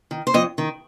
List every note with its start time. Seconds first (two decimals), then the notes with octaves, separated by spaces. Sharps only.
0.11 D#3
0.27 C5
0.34 F2 D#5
0.58 D#3